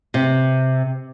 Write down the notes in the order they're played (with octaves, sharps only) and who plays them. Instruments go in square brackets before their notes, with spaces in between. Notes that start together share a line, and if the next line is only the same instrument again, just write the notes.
[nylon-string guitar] C3